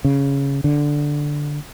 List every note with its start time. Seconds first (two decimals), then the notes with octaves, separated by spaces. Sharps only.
0.05 C#3
0.64 D3